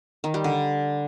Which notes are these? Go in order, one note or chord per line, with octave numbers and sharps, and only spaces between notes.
D#3
G3
D3